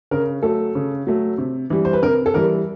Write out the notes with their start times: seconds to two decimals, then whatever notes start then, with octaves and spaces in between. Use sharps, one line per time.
0.11 C#3 A#4
0.43 F#3 A3 A4
0.75 C#3
1.07 F#3 A3
1.38 C3
1.70 E3 G3
1.85 C5
1.93 B4
2.02 C3 A#4
2.26 A4
2.34 E3 G3 A#4